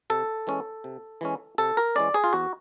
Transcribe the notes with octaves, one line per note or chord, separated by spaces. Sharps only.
C3 A4
E3 G#3 C#4
C3
E3 G#3 C#4
C3 A4
A#4
E3 G#3 C#4 D5
G#4
F4
E2 F#4